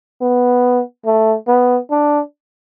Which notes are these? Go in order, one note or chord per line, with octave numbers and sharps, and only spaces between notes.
B3
A3
B3
D4